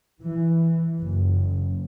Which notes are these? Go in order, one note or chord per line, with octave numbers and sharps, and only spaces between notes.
E3
F#1